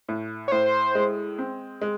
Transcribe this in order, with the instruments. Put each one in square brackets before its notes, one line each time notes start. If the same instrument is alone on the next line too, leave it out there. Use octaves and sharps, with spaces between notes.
[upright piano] A2
[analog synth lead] C#5
[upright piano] A2 [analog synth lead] C5
[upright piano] G#3
C4
G#3